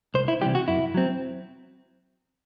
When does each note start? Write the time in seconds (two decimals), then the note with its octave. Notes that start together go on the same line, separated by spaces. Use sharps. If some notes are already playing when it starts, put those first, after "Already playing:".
0.14 C2 C5
0.28 E4
0.41 C3 E3 G3 G4
0.55 F#4
0.68 F#2 E4
0.94 F#3 C4